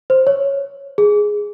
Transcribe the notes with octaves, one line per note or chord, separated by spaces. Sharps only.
C5
C#5
G#4